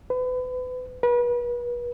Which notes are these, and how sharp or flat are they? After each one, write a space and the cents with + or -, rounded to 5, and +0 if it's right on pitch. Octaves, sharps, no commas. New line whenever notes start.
B4 +35
B4 -35